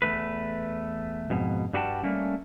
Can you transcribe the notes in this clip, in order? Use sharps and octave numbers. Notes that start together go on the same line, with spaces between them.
E2 G2 A3 B4
F2 G#2 B2
G2 G3 F#4 G4 G5 A5
G3 A3 A#3 C#4